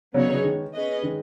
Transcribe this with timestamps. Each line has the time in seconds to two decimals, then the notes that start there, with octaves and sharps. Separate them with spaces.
0.14 C#3 F#3 B3 D#4 G#4 C#5
0.29 C#3 F#3
0.44 D#3 G#3
0.73 C#4 G#4 B4 D#5
1.02 D#3 G#3